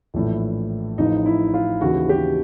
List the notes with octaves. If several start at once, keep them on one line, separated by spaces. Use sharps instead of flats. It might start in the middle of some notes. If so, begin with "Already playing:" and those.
A#1 A2 E3
A1 A2 F3 D#4
E4
F4
D#2 C#3 E3 F#4
G4